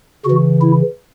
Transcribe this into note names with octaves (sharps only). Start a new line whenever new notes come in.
C#3 F#4
E3
E4